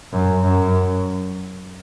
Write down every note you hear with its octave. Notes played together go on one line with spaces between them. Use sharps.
F#2
F#2